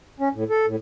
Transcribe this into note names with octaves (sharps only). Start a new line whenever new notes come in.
C#4
A2
A4
A2